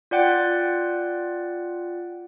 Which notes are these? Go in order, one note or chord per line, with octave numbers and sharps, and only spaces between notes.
F4 D5 F#5 G5